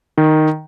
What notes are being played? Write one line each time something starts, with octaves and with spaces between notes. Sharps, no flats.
D#3